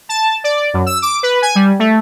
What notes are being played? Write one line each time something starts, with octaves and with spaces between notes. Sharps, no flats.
A5
D5
F#2
E6
D6
B4
G#5
G3
A3